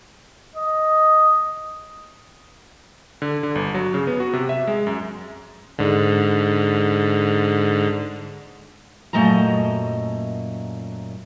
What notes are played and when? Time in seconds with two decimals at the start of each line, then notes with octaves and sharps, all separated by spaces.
0.55 D#5
3.22 D3
3.43 D3
3.55 G1
3.74 F#3
3.94 C#3
4.07 B3
4.20 F#4
4.33 C3
4.49 E5
4.67 G#3
4.87 F#2
5.78 G#2 D3
9.13 F#2 A#2 A3 D#5 A5 A#5